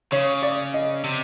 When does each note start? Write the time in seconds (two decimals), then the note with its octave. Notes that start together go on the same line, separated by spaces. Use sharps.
0.12 C#3 C#5
0.42 D5
0.74 D#5
1.04 C3